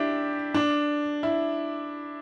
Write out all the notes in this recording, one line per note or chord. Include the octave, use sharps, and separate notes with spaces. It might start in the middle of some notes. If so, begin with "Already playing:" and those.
Already playing: D4 E4 G4
D4
E4